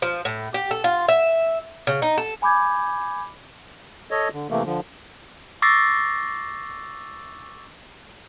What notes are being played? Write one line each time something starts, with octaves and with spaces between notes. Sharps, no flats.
F3
A2
G4
A4
F4
E5
C#3
D#4
A4
G#5 B5 D6 G6 G#6
A4 C#5 D#5
D3
C3 E3 A3 A#3
D3 F3
C#6 D6 E6 A6 A#6 C7